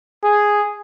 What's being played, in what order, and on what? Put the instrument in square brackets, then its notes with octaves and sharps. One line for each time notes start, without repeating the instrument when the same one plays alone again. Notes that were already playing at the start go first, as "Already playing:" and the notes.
[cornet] G#4